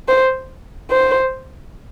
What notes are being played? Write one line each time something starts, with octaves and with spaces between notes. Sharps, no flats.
C5
C5